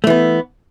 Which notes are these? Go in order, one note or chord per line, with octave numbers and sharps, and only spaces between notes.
E3 A3 B3